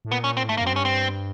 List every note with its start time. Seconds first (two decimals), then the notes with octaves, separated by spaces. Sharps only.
0.05 A2
0.11 A#2 B3
0.24 C#4
0.37 C4
0.43 A2
0.49 G#2 A3
0.57 A#3
0.61 F#2
0.67 C4
0.73 G2 C#4
0.85 C4